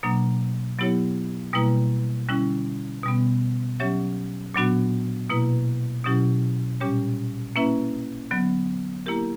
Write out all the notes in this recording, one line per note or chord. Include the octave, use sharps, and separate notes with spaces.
B2 F#3 A#3 D4
F#3 B3 E4 G4 C#5
B2 G3 A#3 E4 B4
D3 G3 C#4 E4
B2 G3 B3
F#3 C#4 G4 C#5 E5
A#2 F#3 B3 D4 F#4
B2 A#3 E4 B4
B2 F#3 C#4 E4 G4
A#2 G3 C#4 G4 C#5
A#3 C#4 E4 B4 E5
D3 F#3 B3
A#3 E4 G4 A#4